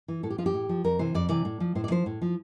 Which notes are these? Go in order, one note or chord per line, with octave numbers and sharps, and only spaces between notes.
E3
A2 A4
G4
F3 F4
G4
A2
F3
F2 A#4
C3 E3 C5
F2 D5
C3 E3 D5
A2
F3
A2 C5
D5
F3 C5
A2
F3